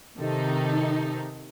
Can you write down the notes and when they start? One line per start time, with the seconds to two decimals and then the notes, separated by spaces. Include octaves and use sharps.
0.19 C3 D#3 D#4 A4